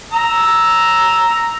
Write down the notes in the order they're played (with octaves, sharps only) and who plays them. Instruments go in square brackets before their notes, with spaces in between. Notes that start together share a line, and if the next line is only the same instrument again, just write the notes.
[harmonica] A#5 E6